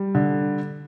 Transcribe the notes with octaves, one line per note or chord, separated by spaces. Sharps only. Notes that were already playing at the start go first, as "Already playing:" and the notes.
Already playing: G3
D3